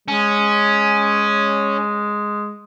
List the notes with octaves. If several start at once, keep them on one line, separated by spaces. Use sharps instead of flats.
G#3 C#4